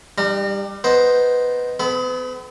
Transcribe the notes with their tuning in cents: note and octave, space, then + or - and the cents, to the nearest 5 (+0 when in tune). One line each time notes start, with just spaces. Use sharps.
G3 +15 D#4 -40 A#5 -30
B3 +0 D#4 +0 C5 +0
B3 +45 A4 -35 B5 +0